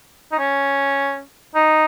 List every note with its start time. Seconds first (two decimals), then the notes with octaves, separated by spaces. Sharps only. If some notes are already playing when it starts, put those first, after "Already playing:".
0.32 D#4
0.39 C#4
1.55 D#4